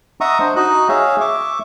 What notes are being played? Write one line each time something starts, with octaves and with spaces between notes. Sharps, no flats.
D#5 E5 F#5 A#5 C#6 D#6
D4 C5
D#4 F#4 D#5 F#6
G#4 C#5 E5 F5
E5 C#6 D6